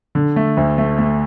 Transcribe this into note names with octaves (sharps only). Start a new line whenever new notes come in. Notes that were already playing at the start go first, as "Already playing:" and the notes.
D3
A3
D2
A3
A3